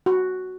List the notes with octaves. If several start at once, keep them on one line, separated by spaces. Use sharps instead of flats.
F#4